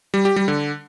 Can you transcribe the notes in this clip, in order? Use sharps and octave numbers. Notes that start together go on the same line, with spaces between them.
G3
G4
G3
D3